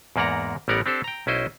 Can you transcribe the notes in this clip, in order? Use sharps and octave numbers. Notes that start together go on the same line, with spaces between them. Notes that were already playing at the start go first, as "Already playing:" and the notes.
E2 G#2 A#3 D5 F#5 A#5
A1 G3 B3 A#4 D5 F#5
C4 D4 G4 A4 C5
G5 A#5
B1 C#4 E4 C5 D#5